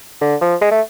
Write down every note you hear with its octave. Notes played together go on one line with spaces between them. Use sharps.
D3
F3
G#3
A3